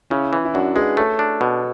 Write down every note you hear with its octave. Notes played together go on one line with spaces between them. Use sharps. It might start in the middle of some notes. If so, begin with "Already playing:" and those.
C#3 C#4 E4
E3
E4
F#2 D4 F#4
G#3 G#4 B4
A3 A4 C#5
D4
B2